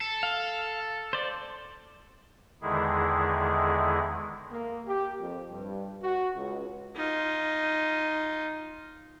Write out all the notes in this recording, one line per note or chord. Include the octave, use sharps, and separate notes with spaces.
A4
F5
C5 D5
E2 D3 D#3 G#3 E4 G#4
A#3
G4
F2
G2
F#4
C#2
D#4 F4